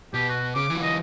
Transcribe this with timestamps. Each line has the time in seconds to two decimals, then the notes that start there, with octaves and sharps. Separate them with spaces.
0.14 B2 G4
0.29 F#4
0.55 C#3 D6
0.70 E3 F#3
0.82 D#5